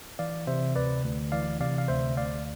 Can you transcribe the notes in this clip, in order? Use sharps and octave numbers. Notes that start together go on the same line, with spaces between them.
E3 D5 F5
C3 C5 E5
D2 B4 D5
D2
E3 D5 F5
C3 D5 F5
F5
D2 C5 E5
D2 D5 F5